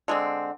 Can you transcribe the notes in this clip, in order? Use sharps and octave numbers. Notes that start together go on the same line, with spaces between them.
D3 G#3 C4